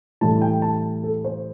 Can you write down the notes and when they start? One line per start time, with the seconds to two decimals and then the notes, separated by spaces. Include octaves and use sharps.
0.21 A2 E3 G3 E4 A5
0.42 G5
0.62 A5
1.04 A4
1.25 C5